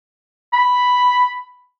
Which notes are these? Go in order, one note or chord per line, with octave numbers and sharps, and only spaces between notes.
B5